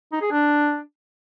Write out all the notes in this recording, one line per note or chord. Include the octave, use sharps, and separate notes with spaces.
D#4
G#4
D4